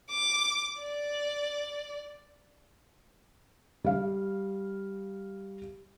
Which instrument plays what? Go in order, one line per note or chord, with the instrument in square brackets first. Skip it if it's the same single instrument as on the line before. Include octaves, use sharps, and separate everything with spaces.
[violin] D6
D5
[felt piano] G3 F5